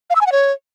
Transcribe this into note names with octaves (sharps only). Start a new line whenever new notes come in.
F5
E6
G#5
F#5
C#5